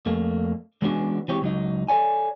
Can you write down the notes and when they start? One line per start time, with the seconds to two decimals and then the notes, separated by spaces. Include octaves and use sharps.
0.06 F2 A3 A#3
0.82 E3 G#3 B3 C#4 D4 F#4
1.28 E3 G#3 C4 G4 C#5
1.42 C#2 F#3 D#4
1.89 A4 C#5 D5 G#5